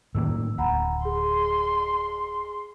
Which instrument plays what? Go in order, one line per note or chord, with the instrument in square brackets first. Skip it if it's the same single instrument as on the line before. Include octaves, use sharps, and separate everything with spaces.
[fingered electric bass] A2 D#3 A#3 [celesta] E6
[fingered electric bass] D1 [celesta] F#5 A#5 B5
[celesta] G#4 [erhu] C6